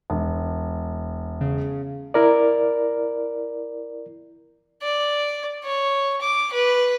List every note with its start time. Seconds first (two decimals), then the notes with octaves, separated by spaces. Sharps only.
0.10 E1
1.41 C#3
2.14 E4 A#4 D5
4.82 D5
5.64 C#5
6.21 D6
6.53 B4